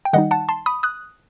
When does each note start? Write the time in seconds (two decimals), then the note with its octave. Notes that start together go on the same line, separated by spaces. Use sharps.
0.05 G5
0.13 D#3 G3 D#4 D#5 F#5
0.31 F#5 A5
0.49 A5 C6
0.66 B5 D#6
0.83 D#6 F#6